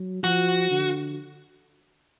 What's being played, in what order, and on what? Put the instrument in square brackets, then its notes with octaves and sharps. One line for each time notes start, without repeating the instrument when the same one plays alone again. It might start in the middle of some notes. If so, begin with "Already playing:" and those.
Already playing: [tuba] F#3
[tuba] F3 [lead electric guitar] F#4
[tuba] D3